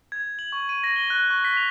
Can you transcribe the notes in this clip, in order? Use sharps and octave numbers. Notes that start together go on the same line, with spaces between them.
G#6
F#7
C#6
D#7
A#6
G7
F#6
C#6
B6
F7